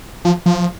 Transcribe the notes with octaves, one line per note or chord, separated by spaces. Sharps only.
F3
F3